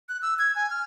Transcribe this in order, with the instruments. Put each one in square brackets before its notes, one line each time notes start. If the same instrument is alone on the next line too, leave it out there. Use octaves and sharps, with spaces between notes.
[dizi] F#6
E6
G#6
G#5
F6